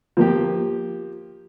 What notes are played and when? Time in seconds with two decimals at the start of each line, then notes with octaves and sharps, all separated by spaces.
0.17 F3 A#3 G4